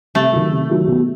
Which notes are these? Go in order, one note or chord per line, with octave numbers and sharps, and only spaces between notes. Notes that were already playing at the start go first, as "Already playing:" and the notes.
C3 A3
D#3 F#3
C3
D#3 F#3
B2